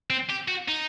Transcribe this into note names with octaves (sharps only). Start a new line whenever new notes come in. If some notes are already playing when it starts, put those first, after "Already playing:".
C4
G4
F#4
D#4